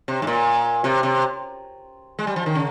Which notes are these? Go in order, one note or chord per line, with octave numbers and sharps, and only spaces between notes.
C3
G#2
A#2
C3
C3
G#3
G3
F3
D#3
C#3